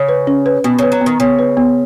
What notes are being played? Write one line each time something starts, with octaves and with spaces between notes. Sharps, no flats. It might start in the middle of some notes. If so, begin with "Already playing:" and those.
Already playing: C#3
B4
C#4
B4
B2 B3
C#3 B4
F#3
D#3 B3
C#3 B3
B4
B3